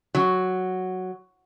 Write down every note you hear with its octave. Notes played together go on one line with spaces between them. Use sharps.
F#3